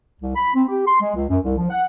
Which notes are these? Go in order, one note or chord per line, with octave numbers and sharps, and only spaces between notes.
C2
B5
C4
G4
C6
G#3
C#2
F#2
C2
F3
F#5